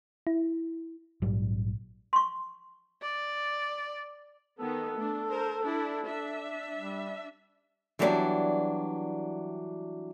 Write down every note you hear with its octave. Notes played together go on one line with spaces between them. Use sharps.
E4
A#1 G#2 F#3 G3
C6 C#6
D5
D#3 B3 A4
A3 D4
A#4 C5
D4 E4
D4 E5
G3
E3 F#3 G3 A3 B3 D4